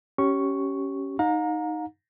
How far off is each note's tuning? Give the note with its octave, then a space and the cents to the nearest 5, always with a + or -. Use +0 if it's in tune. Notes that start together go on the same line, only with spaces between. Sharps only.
C#4 +0 G4 -25 C#6 +0
D#4 +0 F5 +45 A#5 +0